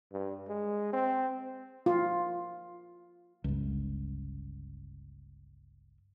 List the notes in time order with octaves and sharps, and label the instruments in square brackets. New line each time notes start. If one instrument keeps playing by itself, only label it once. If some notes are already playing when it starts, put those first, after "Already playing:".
[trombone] G2
G#3
C4
[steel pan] F4
[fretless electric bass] G1 C#2